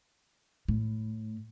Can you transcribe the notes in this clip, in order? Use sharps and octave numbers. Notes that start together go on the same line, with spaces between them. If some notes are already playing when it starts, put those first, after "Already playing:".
A2